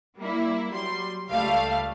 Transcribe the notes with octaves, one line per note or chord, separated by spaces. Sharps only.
G3 A#3 E4
F#3 G3 C6
C#2 G3 A3 F5